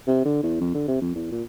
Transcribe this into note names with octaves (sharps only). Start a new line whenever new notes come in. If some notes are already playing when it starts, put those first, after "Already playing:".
C3
D3
E2
F2
D3
C3
F2
E2
A#2